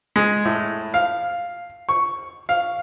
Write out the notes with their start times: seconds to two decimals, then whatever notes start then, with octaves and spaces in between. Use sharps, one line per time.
0.16 G#3
0.45 A2
0.94 F5
1.89 C#6
2.49 F5